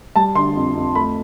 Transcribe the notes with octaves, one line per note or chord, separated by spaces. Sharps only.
G3 A5
D3 C6
F2
F2
A3 B5